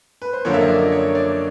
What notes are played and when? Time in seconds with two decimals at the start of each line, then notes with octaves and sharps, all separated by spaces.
0.22 B4
0.33 C5
0.45 F#2 D3 F3 A#3 C#5
0.54 E5
0.61 D#5
0.68 D5
0.92 C#5
1.09 C#5
1.15 D5